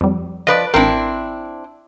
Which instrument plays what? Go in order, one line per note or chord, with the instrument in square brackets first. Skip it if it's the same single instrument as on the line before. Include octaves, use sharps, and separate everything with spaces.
[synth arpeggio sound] F2 G3
[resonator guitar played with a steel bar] F3 B4 D5 [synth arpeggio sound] D#5
[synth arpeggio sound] A1 A#4 [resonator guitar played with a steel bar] C4 D4 E4